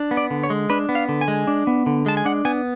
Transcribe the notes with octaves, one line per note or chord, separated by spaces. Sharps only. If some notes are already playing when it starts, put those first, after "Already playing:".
Already playing: D4
B3
D5
D3
C#5
G#3
D4 B4
B3
F5
D3
G#5
G#3
D4
B3
D3
G#3 A5
G#5
D4 F#5
B3 G#5